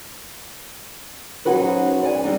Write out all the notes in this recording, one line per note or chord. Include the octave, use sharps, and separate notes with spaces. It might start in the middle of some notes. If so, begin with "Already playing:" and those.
F#3 C#4 D#4 F#4 B4 C5
D5 G#5
G3 C4 D4 D#4